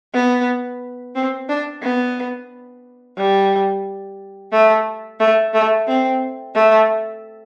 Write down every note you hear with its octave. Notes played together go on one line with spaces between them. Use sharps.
B3
C4
D4
B3
G3
A3
A3
A3
C4
A3